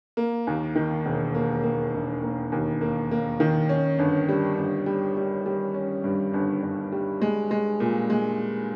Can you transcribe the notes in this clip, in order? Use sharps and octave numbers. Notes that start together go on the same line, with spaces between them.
A#3
D#2
D#3
E1
A#3
A#3
E1
A#3
D#2
A#3
A#3
D#3
C#4
G1
G3
G1
G3
G3
G3
C#4
G2
G1
G1
G3
G#3
G#3
A#2
G#3